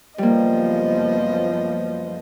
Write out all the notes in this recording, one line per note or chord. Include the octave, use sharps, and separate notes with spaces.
F#1 F3 G3 A#3 B3 D#5